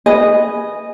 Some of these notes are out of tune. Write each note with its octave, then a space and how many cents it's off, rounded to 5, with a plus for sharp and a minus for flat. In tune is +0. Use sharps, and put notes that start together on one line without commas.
B4 +0 D#5 -10 G#5 +5